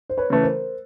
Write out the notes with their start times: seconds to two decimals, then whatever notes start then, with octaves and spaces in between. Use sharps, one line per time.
0.10 C5
0.18 B4 C#5
0.30 C#3 E3 A3 B4
0.43 A#4 C5